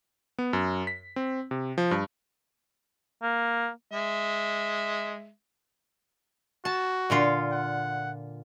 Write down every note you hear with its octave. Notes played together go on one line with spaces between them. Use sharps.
B3
F#2
B6
C4
C3
F3
G2
A#3
G#3 E5
F#4 A5
A#2 D3 F4
F#5